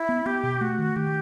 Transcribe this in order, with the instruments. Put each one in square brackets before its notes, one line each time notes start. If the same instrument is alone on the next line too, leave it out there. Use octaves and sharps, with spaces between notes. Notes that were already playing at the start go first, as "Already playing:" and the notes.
Already playing: [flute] E4
[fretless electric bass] B3
[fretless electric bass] B3 [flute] G4
[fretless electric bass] B2
[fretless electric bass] A3 [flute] F#4
[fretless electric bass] D#3
[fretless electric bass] D#3 [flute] G4